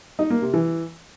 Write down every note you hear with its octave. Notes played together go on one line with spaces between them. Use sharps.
D#4
A#3
C3
E3